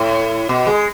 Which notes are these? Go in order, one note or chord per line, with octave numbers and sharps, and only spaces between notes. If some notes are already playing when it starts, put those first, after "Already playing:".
Already playing: A2
B2
G#3